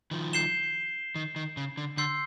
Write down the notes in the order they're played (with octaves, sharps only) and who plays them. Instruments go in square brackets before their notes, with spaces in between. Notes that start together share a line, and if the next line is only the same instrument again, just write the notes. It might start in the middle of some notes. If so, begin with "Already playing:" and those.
[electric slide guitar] D#3 F3
[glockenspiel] G6 C7 E7 G7
[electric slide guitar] D#3
D#3
C#3
D3
[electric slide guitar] D3 [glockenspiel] C6 E6 G6 C7